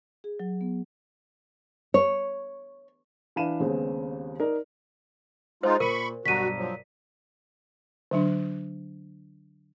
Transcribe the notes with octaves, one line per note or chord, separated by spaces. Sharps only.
G#4
F#3
B3
C#5
E3 D4 F5 B5 D#7 E7
D#2 C#3 G#3 B3 C4
D#4 A#4 D5
G#3 D#4 F4 C5
A#2 A#4 B5 C#6
B1 G2 F#4 A#5 B6 D#7
F3 F#3
D3 F#3 D4